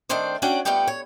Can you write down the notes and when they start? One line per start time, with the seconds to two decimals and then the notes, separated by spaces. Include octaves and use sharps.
0.09 D#3 A3 C4 D4 C5 D5
0.42 C#4 D4 F#4 D5 F#5 G5
0.65 F2 G3 A3 B3 G4 G5
0.88 C#5